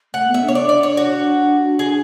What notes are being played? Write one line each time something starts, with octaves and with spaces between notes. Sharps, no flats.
A3 F#5
B3
E5
D4
C#5
D4 D5
D5
C#5
F#4
G#4